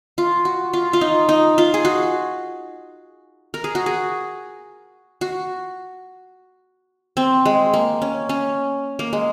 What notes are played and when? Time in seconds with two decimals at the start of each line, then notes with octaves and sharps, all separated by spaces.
0.18 F4
0.45 F#4
0.73 F4
0.93 F4
1.01 D#4
1.29 D#4
1.58 F4
1.74 G#4
1.85 F#4
3.54 A#4
3.64 G#4
3.75 F#4
3.86 G#4
5.21 F#4
7.17 C4
7.46 G#3
7.74 A#3
8.02 C#4
8.29 C#4
8.99 A#3
9.13 G#3